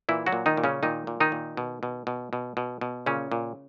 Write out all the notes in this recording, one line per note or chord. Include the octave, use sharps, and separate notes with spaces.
A#2 E3 E4
F#3 F#4
A#2
D#3 D#4
A#2
C#3 C#4
A#2 D#3 D#4
A#2
D#3 D#4
A#2
B2
B2
B2
B2
B2
B2
A#2 C#3 C#4
A#2